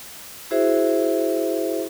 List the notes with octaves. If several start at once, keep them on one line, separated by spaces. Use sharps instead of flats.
E4 F#4 G#4 C5 E5